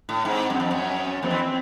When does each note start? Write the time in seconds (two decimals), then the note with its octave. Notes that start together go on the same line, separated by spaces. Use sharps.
0.09 A2
0.25 G#2 C4
0.50 F#2
0.60 F2
0.71 F#2 C#4
1.23 F2 C4
1.31 E3